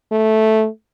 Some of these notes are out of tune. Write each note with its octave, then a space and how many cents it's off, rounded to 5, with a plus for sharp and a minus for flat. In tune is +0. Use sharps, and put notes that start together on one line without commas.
A3 -5